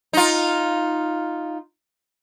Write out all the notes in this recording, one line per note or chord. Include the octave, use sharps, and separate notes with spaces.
D#4 F4